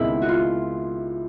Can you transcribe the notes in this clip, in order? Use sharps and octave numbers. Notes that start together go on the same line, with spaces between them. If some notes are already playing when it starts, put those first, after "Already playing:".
Already playing: C#2 C3 D#3 G#3 B3 E4
F#4
F4